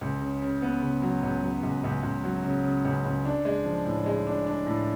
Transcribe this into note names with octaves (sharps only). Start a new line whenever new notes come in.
C#2
C#3
C#3
B3
C#3
F#3
C#2
F#3
C#2
C#2
C#2
F#3
C#3
C#3
C#2
C#2
D4
G#3
F3
A2
G#3
D4
D4
A2